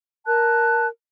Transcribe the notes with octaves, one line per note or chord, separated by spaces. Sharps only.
A#4 A5 F#6